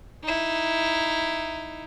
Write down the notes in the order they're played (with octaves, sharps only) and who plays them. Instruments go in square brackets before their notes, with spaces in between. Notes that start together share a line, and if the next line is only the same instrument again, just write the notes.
[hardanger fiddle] D#4 E4